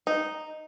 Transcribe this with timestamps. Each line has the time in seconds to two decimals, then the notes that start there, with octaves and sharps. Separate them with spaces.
0.07 D#4